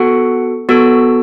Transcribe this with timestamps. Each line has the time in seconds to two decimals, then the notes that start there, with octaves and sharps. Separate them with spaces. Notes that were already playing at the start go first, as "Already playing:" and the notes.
Already playing: B3 F#4 A4 F#5
0.69 B3 F#4 A4 E6